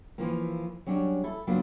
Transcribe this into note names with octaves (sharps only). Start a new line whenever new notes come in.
E3 F3 A#3
F#3 G3 C#4 D4
E4 A4
C#3 F#3 A#3 B3 D4 F4